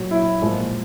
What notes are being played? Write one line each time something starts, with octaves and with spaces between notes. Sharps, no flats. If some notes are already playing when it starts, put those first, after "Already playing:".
Already playing: A#2 F#3
E4
A#2 F3 G#3